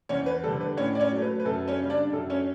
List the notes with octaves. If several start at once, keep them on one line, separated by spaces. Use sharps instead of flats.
E2 C#4 C#5
B4
D3 G3 A4
B4
A2 C#4 C#5
D5
C#4 C#5
F#3 A3
B4
B4
F#2 A4
C#4 C#5
C#3 G3
D4 D5
F#2 A4
C#4 C#5